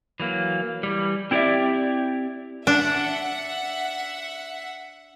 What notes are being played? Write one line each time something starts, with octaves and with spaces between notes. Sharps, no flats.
E3 F#3 A#3
E3 G3
C4 E4 G4 C#5 D5 E5
D4 E5 F#5